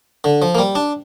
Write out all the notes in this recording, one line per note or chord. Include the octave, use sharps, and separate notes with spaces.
D3
F3
A#3
G3
D4